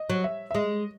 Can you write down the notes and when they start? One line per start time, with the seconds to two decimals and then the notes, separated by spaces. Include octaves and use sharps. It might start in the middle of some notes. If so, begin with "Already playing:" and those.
Already playing: D#5
0.10 F#3
0.24 E5
0.51 E5
0.55 G#3 D#5